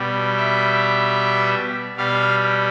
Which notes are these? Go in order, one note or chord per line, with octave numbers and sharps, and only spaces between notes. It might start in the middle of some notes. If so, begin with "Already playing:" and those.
Already playing: B2 G3
E5
B2 G3 F5